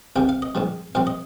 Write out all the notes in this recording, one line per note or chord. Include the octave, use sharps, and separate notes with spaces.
C2 C3 D#3 G5
F5
D#5
A#1 G#2 D#3 G3
A#1 A#2 G3 C4 F5
D#5